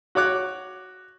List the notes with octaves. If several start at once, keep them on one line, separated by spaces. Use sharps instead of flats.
F#4 C#5 D6 F#6